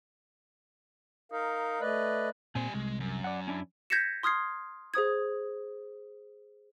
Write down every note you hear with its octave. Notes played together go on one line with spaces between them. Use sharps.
D#4 A#4 F5
A3 B4 D5 D#5
A#2 G3 C4 G#5
C2 G#3
F#2
D5 F#5
C#4 D4 E4
G6 G#6 A#6 B6 C#7 E7
C6 D#6 F6 G#6 C7
G#4 C5 D#6 G#6